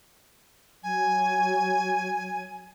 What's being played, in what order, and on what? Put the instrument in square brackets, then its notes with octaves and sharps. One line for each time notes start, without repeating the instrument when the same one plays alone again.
[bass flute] F#3 [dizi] G#5